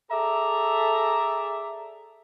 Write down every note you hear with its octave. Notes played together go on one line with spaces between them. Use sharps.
G#4 A4 D5 E5 A#5